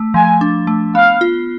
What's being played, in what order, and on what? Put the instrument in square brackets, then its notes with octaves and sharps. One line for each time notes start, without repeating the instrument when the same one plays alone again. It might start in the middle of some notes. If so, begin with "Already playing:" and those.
Already playing: [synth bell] A3
[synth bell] F3 [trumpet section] G#5
[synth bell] D4
A3
[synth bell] B3 [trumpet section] F5
[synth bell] F4